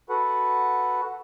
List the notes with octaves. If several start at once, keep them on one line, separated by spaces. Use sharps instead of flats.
F#4 A4 B4 F#5